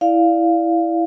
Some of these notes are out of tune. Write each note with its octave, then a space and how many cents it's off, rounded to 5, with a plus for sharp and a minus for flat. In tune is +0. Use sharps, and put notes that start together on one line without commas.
E4 +0 D5 +0 F5 +0